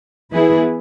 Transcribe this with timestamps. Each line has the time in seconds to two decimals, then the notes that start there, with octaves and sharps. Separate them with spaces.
0.33 E3 B3 E4 G#4 B4